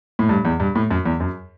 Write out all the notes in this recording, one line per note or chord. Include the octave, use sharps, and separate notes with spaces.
A2
G2
E2
G2
A2
F#2
E2
F#2